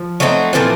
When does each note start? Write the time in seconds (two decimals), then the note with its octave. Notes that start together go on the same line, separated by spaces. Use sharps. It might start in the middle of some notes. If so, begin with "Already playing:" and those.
Already playing: F3
0.20 F#3 A3 C4 D#4
0.53 A#2 E3 F3 A3 C4